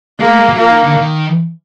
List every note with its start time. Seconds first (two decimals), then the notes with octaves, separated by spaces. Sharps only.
0.19 G#3 A#3
0.29 A3
0.39 G#3
0.49 F#3
0.58 F3 A#3
0.71 D#3
0.84 D3
0.97 D#3